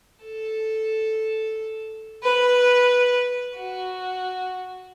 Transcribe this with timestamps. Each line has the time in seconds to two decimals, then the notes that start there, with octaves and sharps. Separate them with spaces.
0.23 A4
2.23 B4
3.55 F#4